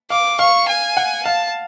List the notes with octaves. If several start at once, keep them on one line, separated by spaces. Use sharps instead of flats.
F5 D6
F5 C#6
G#5
F#5
F5 A5